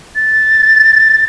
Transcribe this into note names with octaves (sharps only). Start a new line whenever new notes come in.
A6